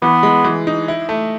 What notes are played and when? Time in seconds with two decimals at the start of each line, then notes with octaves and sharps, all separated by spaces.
0.02 E3 B3
0.23 G#3
0.44 E3
0.67 D#4
0.88 E4
1.09 A3